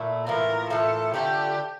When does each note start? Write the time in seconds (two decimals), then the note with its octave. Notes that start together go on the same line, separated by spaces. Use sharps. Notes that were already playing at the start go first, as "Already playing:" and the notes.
Already playing: A#2 A3 E4
0.26 A2 E3 A#3 F4 A#4
0.70 A2 E3 A#3 F4 A4
1.14 D3 F3 A3 D4 G4